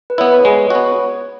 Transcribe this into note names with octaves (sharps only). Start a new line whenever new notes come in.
B4
B3 E4 C#5
G#3 C#5
B3 F#4 C#5